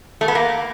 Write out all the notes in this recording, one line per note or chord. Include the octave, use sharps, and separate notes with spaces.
A3
B3
A#3